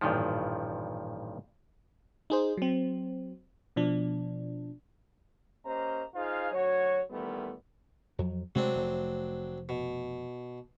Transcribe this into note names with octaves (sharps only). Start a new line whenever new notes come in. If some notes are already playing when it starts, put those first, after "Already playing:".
A1 G2 A#2 D#3 F3
D#4 G#4 C5
F#3 C4
B2 F3 D4
A#3 C#4 G4 C5 D#5 A#5
D#4 F4 G#4 C5 F5
D2 F#3 F#4 C#5
A#2 D#3 E3 G3 A3 B3
F2 F#3
C3 F#3 G#3 A3 C4 D4
F1 A3
B2